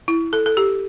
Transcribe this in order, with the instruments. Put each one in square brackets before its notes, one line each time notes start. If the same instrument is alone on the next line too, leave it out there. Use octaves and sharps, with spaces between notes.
[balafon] E4
A4
A4
G4